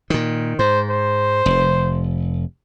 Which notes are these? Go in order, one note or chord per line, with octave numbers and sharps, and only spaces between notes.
A#2 D#3
G#2 C5
C5
F1